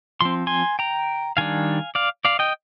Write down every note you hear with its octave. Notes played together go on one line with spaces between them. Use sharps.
F3 C4 C6
G#5 C6
G5 A#5
D#3 G3 D4 F5 G#5
D5 F5
D5 F5
D#5 G5